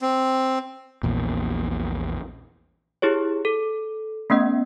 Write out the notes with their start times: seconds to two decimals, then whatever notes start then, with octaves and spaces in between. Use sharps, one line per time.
0.02 C4
1.03 A#1 E2 A#2
3.02 E4 G4 G#4 C#5
3.45 A4
4.30 A3 B3 C#4 D#5